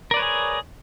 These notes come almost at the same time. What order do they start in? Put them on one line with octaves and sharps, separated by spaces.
A#4 D5 B4 C#5 G#4